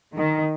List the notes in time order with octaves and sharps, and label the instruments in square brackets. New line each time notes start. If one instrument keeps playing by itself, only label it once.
[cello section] D#3